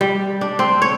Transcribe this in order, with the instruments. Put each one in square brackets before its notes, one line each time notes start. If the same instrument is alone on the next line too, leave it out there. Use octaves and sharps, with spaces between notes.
[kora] G3
D4
C4
C#5